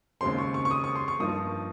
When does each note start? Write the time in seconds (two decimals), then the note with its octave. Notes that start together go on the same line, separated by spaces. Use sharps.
0.21 D#2 C#3 G#3 C4 C6
0.38 C#6
0.54 C#6
0.65 C#6
0.71 D#6
0.84 C#6
0.96 C6
1.08 C#6
1.20 G2 F3 A#3 D#4 D#6